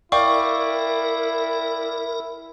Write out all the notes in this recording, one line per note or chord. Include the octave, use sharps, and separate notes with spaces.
E4 A#4 D5 F5 G5 C#6